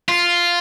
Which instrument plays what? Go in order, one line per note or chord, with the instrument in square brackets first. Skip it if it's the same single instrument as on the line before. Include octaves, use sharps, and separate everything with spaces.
[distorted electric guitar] F4